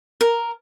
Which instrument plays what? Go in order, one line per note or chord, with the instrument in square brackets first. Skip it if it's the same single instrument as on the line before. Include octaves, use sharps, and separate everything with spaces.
[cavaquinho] A#4